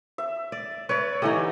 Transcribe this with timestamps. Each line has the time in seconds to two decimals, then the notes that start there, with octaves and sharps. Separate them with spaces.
0.18 E5
0.52 D5
0.89 B4 C#5 D5
1.22 D3 E3 D#4 G4 E5